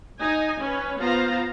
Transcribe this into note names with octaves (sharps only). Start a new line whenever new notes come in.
D#4 G#5
C#4 B4 C#5
B3 F4 C5 F5 A#5